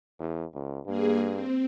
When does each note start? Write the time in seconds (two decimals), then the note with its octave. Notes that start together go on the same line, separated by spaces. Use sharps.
0.20 E2
0.54 C#2
0.86 G2 A#3 G#4
1.30 C4